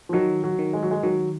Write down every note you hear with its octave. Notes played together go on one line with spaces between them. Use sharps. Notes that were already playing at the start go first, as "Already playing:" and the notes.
F3
D#3 F#3
F#3
D#3
G#3
F#3
G#3
D#3 F#3